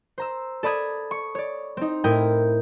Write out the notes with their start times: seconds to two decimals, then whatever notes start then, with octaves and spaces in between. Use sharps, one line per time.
0.18 C5 A#5 E6
0.63 A4 D5 B5 D#6 G#6
1.11 C#6
1.35 C#5 D5
1.77 C4 D#4
2.04 A2 E4 A#4 G5 D#6